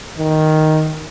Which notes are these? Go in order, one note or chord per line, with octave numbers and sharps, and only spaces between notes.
D#3